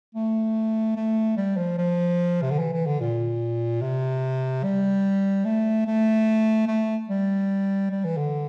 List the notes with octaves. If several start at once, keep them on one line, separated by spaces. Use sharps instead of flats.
A3
A3
G3
F3
F3
C3
D3
E3
E3
D3
A#2
C3
G3
A3
A3
A3
G3
G3
E3
D3